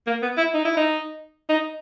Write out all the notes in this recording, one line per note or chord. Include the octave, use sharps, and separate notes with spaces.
A#3
B3
E4
D#4
E4
D#4
D#4